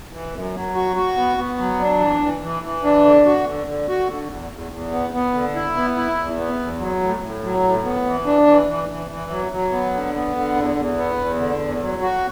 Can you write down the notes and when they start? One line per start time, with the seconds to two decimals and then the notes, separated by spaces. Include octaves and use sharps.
0.13 E3
0.33 F#2
0.54 F#3
0.75 F#4
0.96 F#4
1.17 B3
1.37 B3
1.58 F#3
1.79 D4
2.00 E3
2.22 E3
2.42 E3
2.63 E3
2.84 D4
3.05 D3
3.25 F#4
3.47 D3
3.67 D3
3.88 F#4
4.09 D3
4.30 E2
4.51 E2
4.72 E2
4.92 B3
5.13 B3
5.34 D3
5.55 E4
5.76 B3
5.97 E4
6.18 E2
6.38 B3
6.60 E2
6.80 F#3
7.02 A2
7.22 A2
7.43 F#3
7.64 A2
7.84 B3
8.06 E3
8.26 D4
8.46 E3
8.68 E3
8.89 E3
9.10 E3
9.31 F#3
9.52 F#3
9.72 B3
9.94 D3
10.14 B3
10.35 D3
10.55 E2
10.76 E2
10.98 B3
11.19 E2
11.39 D3
11.60 E2
11.81 F#3
12.02 F#4